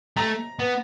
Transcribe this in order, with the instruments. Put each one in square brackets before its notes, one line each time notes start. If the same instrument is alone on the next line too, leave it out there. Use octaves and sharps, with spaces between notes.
[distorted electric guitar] A3 [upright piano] A#5
[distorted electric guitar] B3